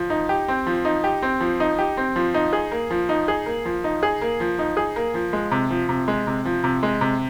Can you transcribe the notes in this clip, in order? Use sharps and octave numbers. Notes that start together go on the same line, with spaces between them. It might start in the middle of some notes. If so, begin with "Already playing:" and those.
Already playing: F3
D#4
G4
C4
F3
D#4
G4
C4
F3
D#4
G4
C4
F3
D#4
G#4
A#3
F3
D#4
G#4
A#3
F3
D#4
G#4
A#3
F3
D#4
G#4
A#3
F3
G#3
C3
F3
C3
G#3
C3
F3
C3
G#3
C3